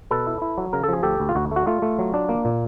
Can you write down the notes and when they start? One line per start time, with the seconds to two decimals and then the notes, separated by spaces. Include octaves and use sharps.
0.11 B2 A4 B4
0.27 E4
0.42 E4
0.58 F#3
0.73 C#3 A#4
0.83 A4
0.89 F3 G#4
1.03 D2 G4 A4
1.20 D2
1.29 F4
1.35 D2 F#4
1.51 A3 F#4
1.67 A3 F4
1.82 A3
1.99 F#3
2.14 D4
2.29 A#3
2.45 A#2